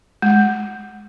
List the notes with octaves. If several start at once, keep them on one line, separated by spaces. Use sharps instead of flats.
G#3